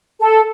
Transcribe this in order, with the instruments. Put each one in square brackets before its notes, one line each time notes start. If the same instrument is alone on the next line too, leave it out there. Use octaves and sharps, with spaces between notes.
[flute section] A4